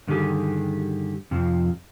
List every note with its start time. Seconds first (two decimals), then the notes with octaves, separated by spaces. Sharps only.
0.08 G2 D3 D#3 F#3 G4 G#4
1.31 F2 C3 F3